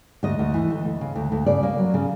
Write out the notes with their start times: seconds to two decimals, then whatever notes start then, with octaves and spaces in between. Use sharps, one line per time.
0.23 D2 D#5
0.39 D2
0.54 E3
0.71 D2
0.85 D2
1.01 C#3
1.16 D2
1.32 D2
1.46 C#3 D5
1.63 A#3
1.78 F#3
1.94 C#3